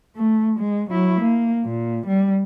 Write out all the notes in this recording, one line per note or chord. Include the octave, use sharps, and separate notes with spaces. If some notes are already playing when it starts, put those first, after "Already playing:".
A3
G#3
F#3 E4
A#3
A#2
G3